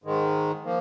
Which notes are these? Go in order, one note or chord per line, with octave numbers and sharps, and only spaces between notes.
G#2 D#3 G#3
F3 A#3